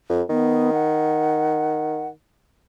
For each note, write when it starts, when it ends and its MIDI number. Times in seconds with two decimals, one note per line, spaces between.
0.09 0.22 41
0.30 2.10 51
0.30 0.71 59
0.73 2.08 78